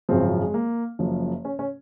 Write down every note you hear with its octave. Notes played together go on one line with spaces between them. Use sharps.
G#1 F#2 C#3 F3 C4
G#3
A#3
F#1 F#2 F3
C#4
C#4